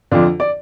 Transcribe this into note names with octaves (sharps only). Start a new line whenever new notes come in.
F2 D3 D4 F4
D5